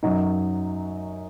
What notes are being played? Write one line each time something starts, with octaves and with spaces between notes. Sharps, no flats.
F#2 F#3 D#4